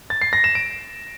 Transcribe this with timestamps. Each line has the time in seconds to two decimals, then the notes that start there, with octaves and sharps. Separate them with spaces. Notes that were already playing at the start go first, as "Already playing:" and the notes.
0.10 A6
0.22 C7
0.33 A#6
0.44 E7
0.55 D7